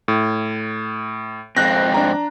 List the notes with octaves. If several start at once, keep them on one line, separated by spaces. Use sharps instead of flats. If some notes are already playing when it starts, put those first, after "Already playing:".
A2
F2 G#2 C4 F#6 A#6
D4 A#5